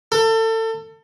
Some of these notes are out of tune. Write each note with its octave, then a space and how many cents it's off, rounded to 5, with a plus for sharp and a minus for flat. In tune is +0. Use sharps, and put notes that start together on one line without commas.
A4 +30